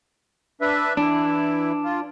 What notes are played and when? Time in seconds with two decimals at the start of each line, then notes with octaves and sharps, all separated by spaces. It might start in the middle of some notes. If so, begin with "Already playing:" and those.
0.61 D4 B4 E5
0.97 E3 D4 E4
1.84 F4